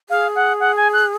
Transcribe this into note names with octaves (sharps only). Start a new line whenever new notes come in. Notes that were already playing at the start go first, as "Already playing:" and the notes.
G#4 F5
F#5
F#5
G#5
F#6